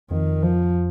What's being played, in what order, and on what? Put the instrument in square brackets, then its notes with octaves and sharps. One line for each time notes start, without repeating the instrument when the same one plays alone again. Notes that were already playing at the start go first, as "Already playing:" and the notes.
[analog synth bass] F2 [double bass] D#3
[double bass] F3